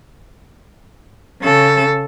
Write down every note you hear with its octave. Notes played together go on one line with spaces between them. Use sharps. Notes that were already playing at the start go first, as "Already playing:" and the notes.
C#3 A4